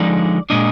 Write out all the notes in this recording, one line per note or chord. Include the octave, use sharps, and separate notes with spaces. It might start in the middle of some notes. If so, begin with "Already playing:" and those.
Already playing: D3 F3 G#3 D#4 D5
A#2 G#3 D4 D#5